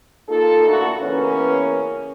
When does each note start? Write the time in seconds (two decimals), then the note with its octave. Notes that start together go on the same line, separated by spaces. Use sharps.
0.29 A#3 D#4 F4 A4
0.67 A#2 D3 A3 A#3 E4 F#4
1.01 C#3 E3 A#3 B3 C#4